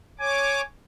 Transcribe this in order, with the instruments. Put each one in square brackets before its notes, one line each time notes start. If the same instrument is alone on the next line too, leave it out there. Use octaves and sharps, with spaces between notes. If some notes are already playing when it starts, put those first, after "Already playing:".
[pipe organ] C#5 D6 [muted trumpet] G#5